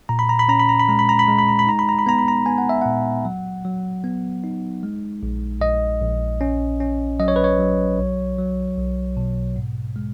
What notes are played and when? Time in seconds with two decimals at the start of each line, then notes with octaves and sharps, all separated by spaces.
0.09 A#2 A#5
0.19 B5
0.29 A#5
0.39 B5
0.48 C#4 A#5
0.59 B5
0.69 A#5
0.79 B5
0.89 G#3 A#5
0.99 B5
1.09 A#5
1.19 B5
1.28 G#3 A#5
1.39 B5
1.49 A#5
1.59 B5
1.67 D#4 A#5
1.79 B5
1.89 A#5
1.99 B5
2.07 B3 A#5
2.19 B5
2.28 A#5
2.46 B3 G#5
2.58 F#5
2.69 E5
2.81 A#2 F#5
3.25 F#3
3.65 F#3
4.04 B3
4.44 D#4
4.83 G#3
5.23 A#1
5.61 A#1 D#5
6.01 A#1
6.41 C#4
6.80 C#4
7.20 F#3 D#5
7.28 C#5
7.36 B4
7.44 C#5
7.59 F#3
7.99 B1
8.38 F#3
8.78 B1
9.17 B2
9.56 G#2
9.96 G#3